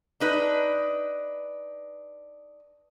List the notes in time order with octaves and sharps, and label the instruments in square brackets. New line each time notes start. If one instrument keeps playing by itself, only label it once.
[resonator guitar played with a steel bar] D4 D#4 B4